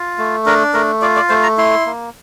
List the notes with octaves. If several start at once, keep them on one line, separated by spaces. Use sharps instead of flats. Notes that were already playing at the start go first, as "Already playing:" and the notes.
Already playing: F4
A3
D4 A#4
A3 A#4
F4 D5
D5
A3 C5
A#5
E4 C6
A#3